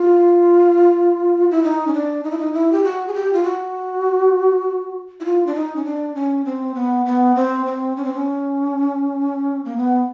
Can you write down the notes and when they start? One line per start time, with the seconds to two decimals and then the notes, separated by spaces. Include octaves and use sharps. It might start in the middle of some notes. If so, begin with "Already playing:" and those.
Already playing: F4
1.51 E4
1.63 D#4
1.87 C#4
1.94 D4
2.24 D#4
2.31 E4
2.38 D#4
2.53 E4
2.72 G4
2.84 F#4
3.07 G#4
3.14 G4
3.33 F4
3.43 F#4
5.20 E4
5.25 F4
5.46 D4
5.55 D#4
5.76 C#4
5.84 D4
6.15 C#4
6.45 C4
6.75 B3
7.06 B3
7.35 C4
7.66 C4
7.96 C#4
8.05 C4
8.13 C#4
9.65 A#3
9.77 B3